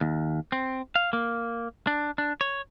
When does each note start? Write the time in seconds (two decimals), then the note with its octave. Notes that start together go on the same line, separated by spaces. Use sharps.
0.01 D#2
0.52 C4
0.96 F5
1.13 A#3
1.87 D4
2.18 D4
2.41 C#5